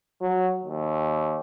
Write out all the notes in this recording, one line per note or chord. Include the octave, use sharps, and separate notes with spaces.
F#3
D#2